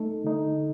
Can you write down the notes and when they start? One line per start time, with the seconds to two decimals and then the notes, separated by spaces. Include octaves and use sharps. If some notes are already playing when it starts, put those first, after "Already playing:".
Already playing: A3 D#4 A4
0.24 D3 A3 D#4